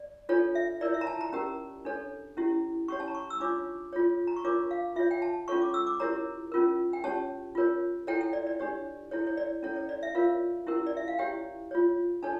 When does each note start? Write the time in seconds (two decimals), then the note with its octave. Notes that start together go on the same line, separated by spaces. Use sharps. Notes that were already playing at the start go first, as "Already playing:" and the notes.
Already playing: D5
0.29 D4 F4 A4 C#5
0.55 E5
0.81 E4 A#4 C#5 D5
0.94 E5
1.01 A#5
1.07 A5
1.21 A#5
1.33 C#4 G4 A#4 A#5
1.85 D4 A4 C#5
2.37 C#4 E4 G4
2.88 C#4 G4 C#5 C#6
3.00 A5
3.08 A#5
3.15 C#6
3.30 E6
3.40 D4 F4 C#5 D6
3.93 F4 A4 C#5
4.27 A#5
4.36 C#6
4.44 D4 F4 A#4 C#5 D6
4.71 F5
4.96 F4 C#5 E5
5.11 G5
5.22 A5
5.48 C#4 F4 A4 C#5 C#6
5.62 D6
5.74 E6
5.87 D6
6.00 E4 G4 A#4 C#5 A#5
6.52 C#4 F4 A#4
6.93 G5
7.04 C#4 G4 C#5 A5
7.55 F4 A#4 C#5
8.07 E4 A4 C#5 G5
8.21 G5
8.33 D5
8.47 D5
8.60 D4 G4 C#5
9.11 E4 A4 C#5
9.27 C#5
9.37 D5
9.63 C#4 E4 A4 C#5
9.76 C#5
9.89 D5
10.03 E5
10.15 F4 A#4 C#5 F5
10.67 C#4 E4 G4 A#4
10.87 D5
10.97 E5
11.08 F5
11.19 E4 G4 C#5 G5
11.71 F4 C#5
12.23 D4 A4 C#5 A5